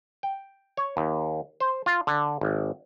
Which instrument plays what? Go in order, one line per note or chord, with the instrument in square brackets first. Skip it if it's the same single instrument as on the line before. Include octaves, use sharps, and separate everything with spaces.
[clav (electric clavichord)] G5
C#5
D#2
C5
F4
D3
G#1